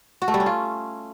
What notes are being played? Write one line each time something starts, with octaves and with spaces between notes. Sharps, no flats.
F#4
A3
G3
C#4
F4